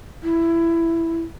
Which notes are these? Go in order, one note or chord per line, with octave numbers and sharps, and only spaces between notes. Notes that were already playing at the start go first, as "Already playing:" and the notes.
E4